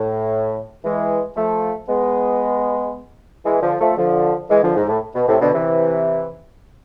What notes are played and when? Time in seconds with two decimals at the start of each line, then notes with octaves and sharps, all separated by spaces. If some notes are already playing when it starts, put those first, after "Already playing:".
Already playing: A2
0.84 E3 G#3
1.36 F3 A3
1.88 G#3 B3
3.45 E3 G#3
3.62 D3 F3
3.80 F3 A3
3.97 D3 F3
4.50 E3 G#3
4.63 D3 F3
4.76 G#2
4.89 A2
5.15 B2
5.28 A2 C3
5.41 B2 D3
5.54 C3 E3